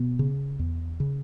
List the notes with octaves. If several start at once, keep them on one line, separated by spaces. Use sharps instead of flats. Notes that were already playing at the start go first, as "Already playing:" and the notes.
Already playing: B2 B3
C#3
E2
C#3